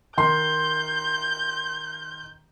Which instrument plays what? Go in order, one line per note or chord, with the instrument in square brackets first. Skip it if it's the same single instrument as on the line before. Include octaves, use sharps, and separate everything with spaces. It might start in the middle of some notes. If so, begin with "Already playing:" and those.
[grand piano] D#3 C6 [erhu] G6